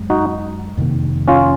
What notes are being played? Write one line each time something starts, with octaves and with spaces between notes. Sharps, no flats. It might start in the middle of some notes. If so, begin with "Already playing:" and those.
Already playing: F#2 G#3
D#4 F#4
F2 C3 D#3 A#3
C#4 F4